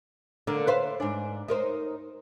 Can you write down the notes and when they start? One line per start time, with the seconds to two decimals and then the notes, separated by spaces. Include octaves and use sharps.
0.47 D3 A#3
0.67 B4 C5 F5
1.00 G#2 D4
1.48 D#4 A#4 C5